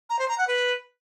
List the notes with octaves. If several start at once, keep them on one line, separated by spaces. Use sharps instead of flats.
A#5
C5
A#5
F#5
B4